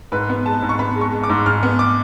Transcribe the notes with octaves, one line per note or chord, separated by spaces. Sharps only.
G#2 B4
B3
G#3 A5
G#2
C#6
B3 B5
G#3
C#6
G#3
D6
G#2
G#2 F6
B3
D6